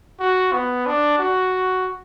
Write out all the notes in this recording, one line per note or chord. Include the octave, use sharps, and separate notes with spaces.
F#4
B3
D4
F#4